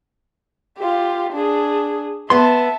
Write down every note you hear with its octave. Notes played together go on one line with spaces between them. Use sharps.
F4 G4
D4 G#4
B3 E5 A5 C6